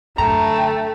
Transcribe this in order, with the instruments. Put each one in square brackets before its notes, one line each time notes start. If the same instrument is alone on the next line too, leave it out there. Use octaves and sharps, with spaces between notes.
[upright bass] F#2 D3 [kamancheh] A3 [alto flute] G5 [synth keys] A#5